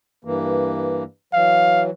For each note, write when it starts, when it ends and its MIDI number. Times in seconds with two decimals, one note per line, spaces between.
0.25 1.04 43
0.25 1.04 52
0.25 1.04 58
1.33 1.90 52
1.33 1.90 54
1.33 1.83 77